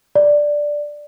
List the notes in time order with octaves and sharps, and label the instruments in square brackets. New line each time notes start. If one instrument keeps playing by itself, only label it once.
[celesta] D5